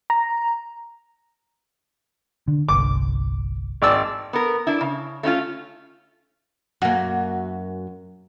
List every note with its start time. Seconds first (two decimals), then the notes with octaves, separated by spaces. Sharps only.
0.10 A#5
2.48 D3
2.69 G1 C2 D6
3.82 G#1 D5 E6
4.33 B3 A#4
4.67 D4 E4
4.81 C#3
5.23 A3 C#4 E4 F4
6.82 F#2 A#3 F#4